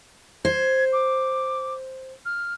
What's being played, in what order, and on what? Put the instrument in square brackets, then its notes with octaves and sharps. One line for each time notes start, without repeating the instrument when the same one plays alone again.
[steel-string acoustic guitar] C5 [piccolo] G#6
[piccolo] D6
F6